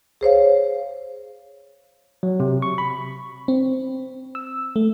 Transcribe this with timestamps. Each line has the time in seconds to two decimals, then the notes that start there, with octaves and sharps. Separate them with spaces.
0.21 G#4 C5 C#5 F5
2.23 F#3
2.40 C3
2.62 C#6
2.78 B5
3.48 C4
4.35 E6
4.76 A3